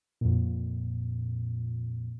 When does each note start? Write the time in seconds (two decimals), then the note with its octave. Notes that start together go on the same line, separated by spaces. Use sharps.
0.21 F2 A#2